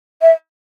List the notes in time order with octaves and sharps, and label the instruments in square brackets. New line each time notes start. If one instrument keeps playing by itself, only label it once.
[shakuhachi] E5